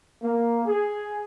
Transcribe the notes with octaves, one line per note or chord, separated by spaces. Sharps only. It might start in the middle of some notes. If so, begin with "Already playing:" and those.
A#3
G#4